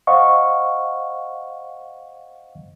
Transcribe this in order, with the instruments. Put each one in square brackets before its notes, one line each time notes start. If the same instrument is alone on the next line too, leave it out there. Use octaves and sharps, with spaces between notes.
[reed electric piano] C5 D#5 F5 F#5 C#6